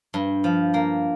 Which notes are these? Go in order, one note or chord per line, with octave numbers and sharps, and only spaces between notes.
G2
F3
A#3